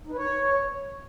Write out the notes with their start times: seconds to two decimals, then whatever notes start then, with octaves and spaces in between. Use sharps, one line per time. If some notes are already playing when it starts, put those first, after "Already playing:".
0.07 D#4
0.12 B4
0.17 C#5